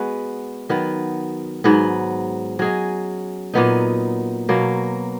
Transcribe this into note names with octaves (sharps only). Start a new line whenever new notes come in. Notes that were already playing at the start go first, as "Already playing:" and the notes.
Already playing: G#3 B3 F#4 B4
D#3 F#3 B3
G#2 F#3 B3
F#3 C#4 G#4 D#5
A#2 F#3 B3 D#4
B2 F#3 A#3